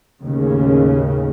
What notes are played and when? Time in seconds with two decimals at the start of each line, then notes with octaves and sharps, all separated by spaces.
0.22 D#2 A2 C#3